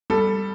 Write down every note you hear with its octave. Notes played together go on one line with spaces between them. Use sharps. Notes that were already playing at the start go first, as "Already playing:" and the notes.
G3 A4